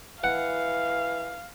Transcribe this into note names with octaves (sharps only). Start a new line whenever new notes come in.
E3 F5 F#5